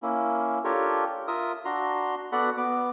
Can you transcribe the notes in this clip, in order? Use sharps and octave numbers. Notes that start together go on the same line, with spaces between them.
A#3 C#4 E4
D4 F4 G4 A4 A#4 C#5
F4 A#4 E5 D#6
D4 F#4 A#5 C6
B3 F#4 A4 D5 F#5 B5
B3 D6